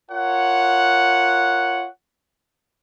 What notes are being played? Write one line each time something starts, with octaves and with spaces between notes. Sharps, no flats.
F4 A#4 C#5 F#5